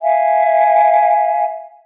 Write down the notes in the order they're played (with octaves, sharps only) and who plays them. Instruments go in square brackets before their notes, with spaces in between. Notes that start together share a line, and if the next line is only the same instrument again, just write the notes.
[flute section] E5 F5 G#5